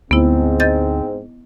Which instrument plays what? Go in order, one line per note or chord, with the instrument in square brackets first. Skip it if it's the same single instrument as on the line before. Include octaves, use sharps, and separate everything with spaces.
[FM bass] D2 [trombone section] G#2 C4 [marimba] B3 E4
[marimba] D#5 G6 A6